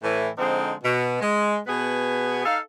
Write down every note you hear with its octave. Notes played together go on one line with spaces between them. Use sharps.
A2 E3
D3 F3 G#3 C4 D#4
B2
G#3
B2 B3 G#4 B4
D#4 A4 F5